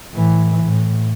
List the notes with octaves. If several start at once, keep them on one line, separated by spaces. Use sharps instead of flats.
A2 E3
A2